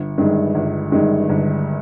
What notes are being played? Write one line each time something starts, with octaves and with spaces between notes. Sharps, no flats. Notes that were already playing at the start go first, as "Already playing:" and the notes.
Already playing: G1
G2 D#3 G#3
G1
G2 D#3 G#3
G1